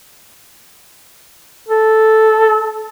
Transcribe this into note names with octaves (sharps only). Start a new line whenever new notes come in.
A4